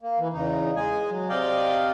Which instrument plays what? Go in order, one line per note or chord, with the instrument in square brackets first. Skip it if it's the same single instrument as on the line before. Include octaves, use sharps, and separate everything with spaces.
[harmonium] A#3
E3
E2 C#3 D#4
G#3 G#4 G#5
F#3
C3 D5 D#5 F5 G5